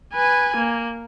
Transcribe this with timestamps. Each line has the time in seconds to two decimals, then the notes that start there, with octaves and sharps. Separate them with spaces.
0.14 B4 G#5
0.56 A#3